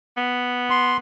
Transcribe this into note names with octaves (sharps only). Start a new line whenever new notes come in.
B3
C6